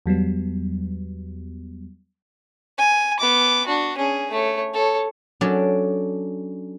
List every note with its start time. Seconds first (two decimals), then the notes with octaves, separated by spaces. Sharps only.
0.06 E2 F#3 G3 B3
2.78 G#5
3.19 B3 D6
3.67 D4 F#4
3.97 C#4 G#4
4.31 A3 C#5
4.74 A4 C#5
5.41 F#3 C#4 D4 A4 D5